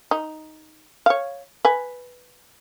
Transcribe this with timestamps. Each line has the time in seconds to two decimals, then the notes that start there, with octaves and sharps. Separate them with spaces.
0.11 D#4
1.06 C#5 F5
1.65 B4 G#5